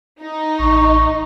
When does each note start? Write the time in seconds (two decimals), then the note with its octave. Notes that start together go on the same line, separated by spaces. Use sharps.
0.21 D#4
0.59 A1 C#6